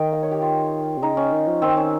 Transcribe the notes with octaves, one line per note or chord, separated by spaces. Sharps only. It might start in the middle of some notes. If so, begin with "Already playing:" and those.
Already playing: D#3 D#5 G5
F5
C#5
G4
F4
C3
C#3 D#4
C#4
D#3
F3
D#3 C4
C#4